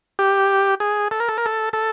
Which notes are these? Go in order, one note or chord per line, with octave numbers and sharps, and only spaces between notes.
G4
G#4
A4
A#4
A4
A#4
A4
A4